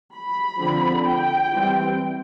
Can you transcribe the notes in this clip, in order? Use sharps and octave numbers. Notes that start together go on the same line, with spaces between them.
B5
D3 F3 C4
G5
E3 G3 C4